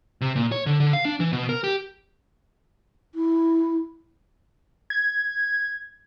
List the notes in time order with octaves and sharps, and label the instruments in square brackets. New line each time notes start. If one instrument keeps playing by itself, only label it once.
[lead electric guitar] C3
A#2
C#5
D3
D3
F5
D4
E3
B2
A#4
G4
[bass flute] E4
[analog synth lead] G#6